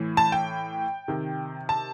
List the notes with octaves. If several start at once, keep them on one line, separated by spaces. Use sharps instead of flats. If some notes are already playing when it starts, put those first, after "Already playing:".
Already playing: A2 E3
A5
G5
C3 D#3
A5